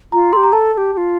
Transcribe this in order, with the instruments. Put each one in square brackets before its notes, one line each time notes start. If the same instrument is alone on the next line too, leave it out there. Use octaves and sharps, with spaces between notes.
[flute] F4 [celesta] A#5
[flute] A4 [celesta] C6
[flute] G4
[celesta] A#5
[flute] A4 [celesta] A5
[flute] A4
G4
G4
F4